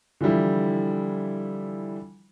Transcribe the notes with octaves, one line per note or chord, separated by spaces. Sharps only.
D3 E3 F3 G3 E4